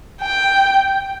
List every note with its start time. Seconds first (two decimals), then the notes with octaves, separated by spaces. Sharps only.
0.22 G5